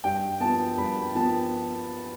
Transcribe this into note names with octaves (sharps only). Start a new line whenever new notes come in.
G2 G5
F3 B3 A5
G2 B5
F3 B3 A5